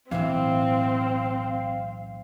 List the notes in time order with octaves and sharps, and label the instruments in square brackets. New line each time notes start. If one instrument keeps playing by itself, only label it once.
[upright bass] B1 A2 [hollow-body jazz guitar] E3 E5 [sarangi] C4 [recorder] F5